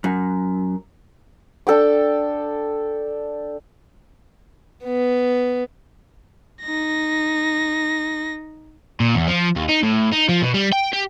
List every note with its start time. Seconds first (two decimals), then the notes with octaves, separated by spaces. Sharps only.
0.04 F#2
1.67 D4 A4 G5 D6
4.84 B3
6.62 D#4 A#6
9.00 A#2
9.15 E2
9.28 F3
9.56 D#2
9.69 D#4
9.83 A2
10.12 D#4
10.29 F3
10.42 B2
10.54 G3
10.72 G5
10.93 G4